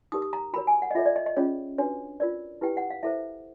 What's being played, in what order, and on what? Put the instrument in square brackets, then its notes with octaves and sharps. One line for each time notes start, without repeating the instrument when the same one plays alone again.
[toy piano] D#4 G4 A#4 D#6
D#6
A#5
F#4 A#4 C#5 B5
G#5
F#5
D#5
F4 A4 C#5 E5
D5
D#5
D#5
C#4 F4 G#4 C#5
D4 F#4 B4 C#5
F4 A#4 C#5 D5
E4 G4 B4 G5
F#5
F5
E4 A4 C5 E5